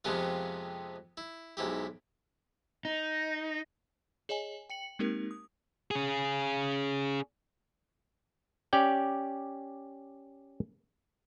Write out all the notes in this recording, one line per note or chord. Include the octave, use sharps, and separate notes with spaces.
F2 C3 G#3 B3 F4
E4
B1 G#2 E4 G4
D#4
G#4 C#5 D#5 G#5
G5 C#7 F#7
G#3 A#3 C4 D#4 G4 A#4
D#6
C#4 G#4
C#4 G4 D5 G5